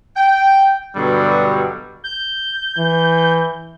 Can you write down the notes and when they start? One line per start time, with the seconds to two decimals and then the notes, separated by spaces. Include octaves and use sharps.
0.16 G5
0.96 G2 B2 D3 F#3 G3
2.04 G6
2.78 E3